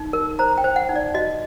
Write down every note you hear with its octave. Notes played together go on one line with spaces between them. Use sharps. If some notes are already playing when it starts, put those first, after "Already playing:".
Already playing: D#4
A#4
C5 A#5
G5
C5
F#5
D#4
D5
F#4 D#5